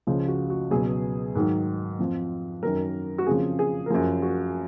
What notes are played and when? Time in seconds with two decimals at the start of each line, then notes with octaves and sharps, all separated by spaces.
0.07 C#2 C#3 F3
0.28 F#4
0.50 F#4
0.71 C#2 B2 F#3 G#4
1.35 G#2 D#3 F#3
1.99 F2 F3
2.63 F#2 D#3 F#3 A#4
3.18 F#4
3.27 F2 C#3 F3 G#4
3.59 G#4
3.86 A#4
3.90 F#2 F3 G#4
4.22 F#4